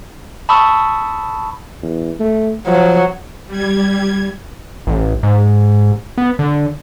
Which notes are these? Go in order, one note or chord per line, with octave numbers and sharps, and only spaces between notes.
A5 B5 C#6 D#6 E6
E2
A3
F3 F#3
G3 G#6
A1
G#2
B3
D3